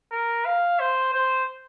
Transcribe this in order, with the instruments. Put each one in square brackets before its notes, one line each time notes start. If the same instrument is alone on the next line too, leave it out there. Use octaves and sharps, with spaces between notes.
[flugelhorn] A#4
F5
C5
C5